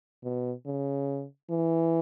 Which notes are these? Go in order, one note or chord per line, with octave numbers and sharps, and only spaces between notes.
B2
C#3
E3